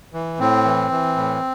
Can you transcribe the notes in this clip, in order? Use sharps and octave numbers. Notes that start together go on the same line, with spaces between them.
E3
A2 C4
E3
E3
A2